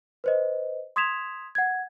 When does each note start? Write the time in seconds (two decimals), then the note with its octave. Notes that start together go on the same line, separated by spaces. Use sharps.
0.24 B4 C5 D#5
0.96 C6 D#6 G#6 B6 E7 F7
1.55 F#5 G#6